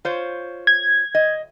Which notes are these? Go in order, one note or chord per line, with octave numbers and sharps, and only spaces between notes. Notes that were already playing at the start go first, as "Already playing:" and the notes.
F4 C5 C#5
G#6
D#5